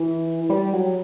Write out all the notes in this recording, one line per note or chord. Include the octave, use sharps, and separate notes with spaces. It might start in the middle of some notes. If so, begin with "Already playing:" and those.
Already playing: E3
G3
F#3